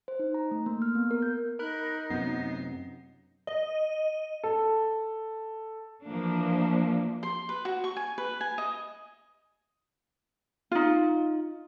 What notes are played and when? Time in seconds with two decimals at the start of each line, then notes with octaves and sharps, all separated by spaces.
0.08 C5
0.19 D#4
0.34 A#5
0.51 A3
0.66 A#3
0.82 F6
0.95 B3
1.11 A#4
1.22 G6
1.59 D#4 A#4 B5 F#6
2.10 F#2 C3 B3 C7
3.47 D#5
4.44 A4
6.06 E3 F3 A#3 D4
7.23 C6
7.49 B4
7.65 F#4
7.84 C#6
7.97 G#5
8.18 B4
8.41 G#5
8.58 D#5
10.71 D#4 F4